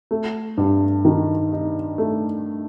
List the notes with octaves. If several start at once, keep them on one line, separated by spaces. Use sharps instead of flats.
A3
G2
D#3
D#4
A3